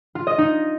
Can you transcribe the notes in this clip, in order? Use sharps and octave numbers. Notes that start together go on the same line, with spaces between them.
F4
D#5
D#4